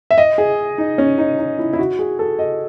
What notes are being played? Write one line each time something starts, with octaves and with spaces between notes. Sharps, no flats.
E5
D#5
G#4
D#4
C#4
D#4
D#4
E4
E4
F#4
G#4
A4
D#5